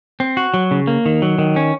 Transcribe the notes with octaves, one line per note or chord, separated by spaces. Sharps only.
C4
F#4
F#3
C#3
A#3
D#3
F#3
D#3
C#4